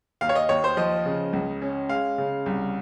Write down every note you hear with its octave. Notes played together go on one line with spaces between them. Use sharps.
D#2 F5
C#5
D#5
D#2 C#5
C5
F3 D#5
C#3
C#2
C#4
G#3 F5
C#3
C2